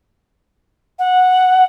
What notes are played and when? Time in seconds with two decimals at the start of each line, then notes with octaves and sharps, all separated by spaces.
0.99 F#5